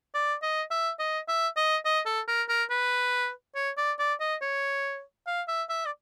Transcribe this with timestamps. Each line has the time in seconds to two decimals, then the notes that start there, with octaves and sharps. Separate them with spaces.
0.14 D5
0.42 D#5
0.71 E5
0.99 D#5
1.28 E5
1.57 D#5
1.85 D#5
2.06 A4
2.28 A#4
2.49 A#4
2.70 B4
3.55 C#5
3.77 D5
3.99 D5
4.20 D#5
4.42 C#5
5.27 F5
5.48 E5
5.69 E5
5.86 D5